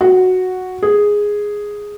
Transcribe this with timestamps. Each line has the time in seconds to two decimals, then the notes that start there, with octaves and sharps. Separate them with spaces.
0.01 F#4
0.83 G#4